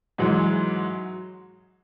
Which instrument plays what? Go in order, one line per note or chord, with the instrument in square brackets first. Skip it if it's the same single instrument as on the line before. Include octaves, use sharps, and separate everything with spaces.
[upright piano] G#2 E3 G#3 [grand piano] F#3